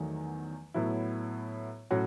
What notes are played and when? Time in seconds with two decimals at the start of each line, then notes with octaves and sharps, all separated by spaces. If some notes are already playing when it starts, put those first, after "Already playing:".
Already playing: E2 D#3 F#3 A3
0.74 A2 F#3 B3 E4
1.91 A2 F#3 C#4 F#4